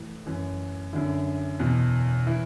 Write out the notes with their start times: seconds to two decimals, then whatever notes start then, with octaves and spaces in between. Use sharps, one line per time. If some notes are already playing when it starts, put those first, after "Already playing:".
Already playing: A2 E3
0.26 F#2 E3
0.93 F#2 D3 E4
1.59 E2 B2
2.26 E3 E4